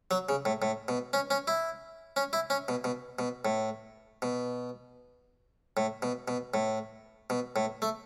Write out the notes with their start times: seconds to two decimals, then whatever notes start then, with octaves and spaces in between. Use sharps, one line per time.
0.11 F#3
0.29 C#3
0.45 A2
0.62 A2
0.88 B2
1.13 C#4
1.30 C#4
1.48 E4
2.16 C#4
2.33 E4
2.50 C#4
2.68 B2
2.84 B2
3.19 B2
3.45 A2
4.22 B2
5.77 A2
6.02 B2
6.28 B2
6.54 A2
7.30 B2
7.56 A2
7.82 A3